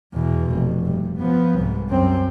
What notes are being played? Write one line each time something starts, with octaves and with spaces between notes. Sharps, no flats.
E2 B2
F1
G2
F3 B3
C2 G#2
F#2 C4